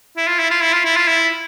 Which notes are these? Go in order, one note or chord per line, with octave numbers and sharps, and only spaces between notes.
E4
F4
E4
F4
E4
F4
E4
F4
E4